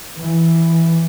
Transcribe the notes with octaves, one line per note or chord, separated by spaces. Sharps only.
E3